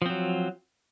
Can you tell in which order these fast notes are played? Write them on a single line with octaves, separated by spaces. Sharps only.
F3 C4 F#3